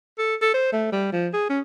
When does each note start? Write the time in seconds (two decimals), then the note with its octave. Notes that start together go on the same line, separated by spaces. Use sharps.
0.18 A4
0.42 A4
0.54 C5
0.72 A3
0.92 G3
1.13 F3
1.33 G#4
1.49 C#4